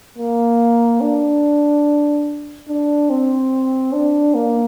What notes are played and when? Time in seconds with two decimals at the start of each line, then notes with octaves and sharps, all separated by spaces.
0.18 A#3
1.01 D4
2.68 D4
3.10 C4
3.92 D4
4.34 A#3